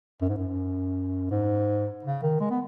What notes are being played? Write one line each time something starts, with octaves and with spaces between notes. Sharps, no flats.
F#2
G#2
F#2
G#2
C#3
D#3
G#3
B3